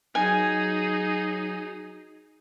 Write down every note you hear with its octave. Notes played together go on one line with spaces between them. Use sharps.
F#3 D#4 G#4 G#5